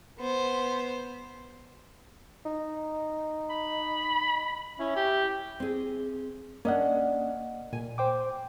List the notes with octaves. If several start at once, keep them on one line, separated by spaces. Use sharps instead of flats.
B3 C5
D#4
B5
C#4 E4
G4
C4 G#4
A#3 C#4 D4 D#5 F#5
A#2 G#5
C5 G5 D6